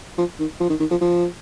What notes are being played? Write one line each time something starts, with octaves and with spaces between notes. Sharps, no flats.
F3
D#3
F3
D#3
D#3
F3
F3